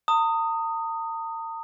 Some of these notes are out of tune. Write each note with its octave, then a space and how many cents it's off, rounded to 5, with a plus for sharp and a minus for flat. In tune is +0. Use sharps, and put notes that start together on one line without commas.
A#5 -45 D#6 +0